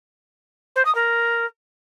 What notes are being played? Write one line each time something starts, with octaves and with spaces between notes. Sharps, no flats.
C5
D#6
A#4